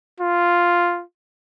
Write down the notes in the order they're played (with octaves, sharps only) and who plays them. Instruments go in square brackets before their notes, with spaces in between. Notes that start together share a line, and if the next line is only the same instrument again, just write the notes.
[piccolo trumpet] F4